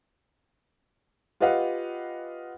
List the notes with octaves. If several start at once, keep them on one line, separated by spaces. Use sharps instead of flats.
F4 G4 B4 D#5 F5 F#5